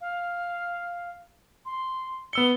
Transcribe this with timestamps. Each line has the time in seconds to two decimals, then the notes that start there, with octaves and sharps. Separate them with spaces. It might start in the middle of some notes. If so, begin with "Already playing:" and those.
0.01 F5
1.65 C6
2.33 B3 E6 C#7 G7